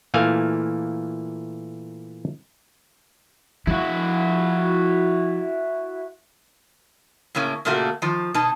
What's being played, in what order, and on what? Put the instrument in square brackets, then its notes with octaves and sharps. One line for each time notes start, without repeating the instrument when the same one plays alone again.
[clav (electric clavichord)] A#2 E3 A3 A#3 F5 G#5
[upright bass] F3 [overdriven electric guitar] E4 F#4
[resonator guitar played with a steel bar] A2 C#3 A#3 C#4
A#2 C#3 A3 A#3 F#4
D#3 F3
B2 D#4 A5